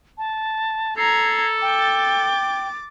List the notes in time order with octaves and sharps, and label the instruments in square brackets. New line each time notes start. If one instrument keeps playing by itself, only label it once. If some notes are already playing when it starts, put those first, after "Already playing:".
[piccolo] A5
[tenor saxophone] A4 [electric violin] A#5 G#6 [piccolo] C7
[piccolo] G5 [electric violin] D6 A6